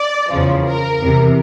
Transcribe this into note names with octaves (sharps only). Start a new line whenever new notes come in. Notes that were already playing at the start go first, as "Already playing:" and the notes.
Already playing: D5
E2 C#3 F3
A#4
E2 C3 E3